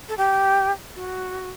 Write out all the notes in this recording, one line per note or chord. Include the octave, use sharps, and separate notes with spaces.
A4
G4
F#4